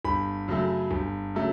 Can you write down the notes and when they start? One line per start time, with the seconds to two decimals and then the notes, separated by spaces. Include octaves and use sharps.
0.05 G1 B5
0.48 F#2 C#3 F#3 A3
0.91 G1
1.35 C#3 F#3 A3